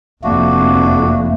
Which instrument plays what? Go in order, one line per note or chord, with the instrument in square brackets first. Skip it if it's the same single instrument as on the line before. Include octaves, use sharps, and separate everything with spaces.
[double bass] F1 F2 [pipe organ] A3 A#3 [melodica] D4 F#4